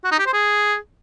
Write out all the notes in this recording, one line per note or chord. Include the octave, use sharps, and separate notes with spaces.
F#4
D#4
G4
C5
G#4